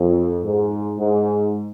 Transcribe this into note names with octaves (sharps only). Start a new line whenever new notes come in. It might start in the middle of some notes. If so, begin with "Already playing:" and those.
Already playing: F2
G#2
G#2